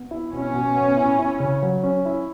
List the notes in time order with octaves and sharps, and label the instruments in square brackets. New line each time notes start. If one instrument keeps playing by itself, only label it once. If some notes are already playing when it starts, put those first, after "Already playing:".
Already playing: [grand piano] B3
E4
[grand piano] B2 [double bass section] C#4
[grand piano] B2
B3
E4
E4
C#3
F#3
C#4
E4